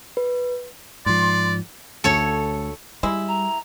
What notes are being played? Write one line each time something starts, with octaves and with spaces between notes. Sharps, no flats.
B4
G#2 F3 D5 C6
D2 A4 C#5
G3 G#3 E4
A#5